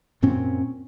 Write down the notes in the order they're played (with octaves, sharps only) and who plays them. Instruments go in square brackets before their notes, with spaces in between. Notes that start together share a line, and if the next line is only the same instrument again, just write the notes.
[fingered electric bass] F#2 A#2 C4 C#4